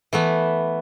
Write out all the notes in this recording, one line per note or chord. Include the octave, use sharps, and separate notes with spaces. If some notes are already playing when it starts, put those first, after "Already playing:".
E3 A3 B3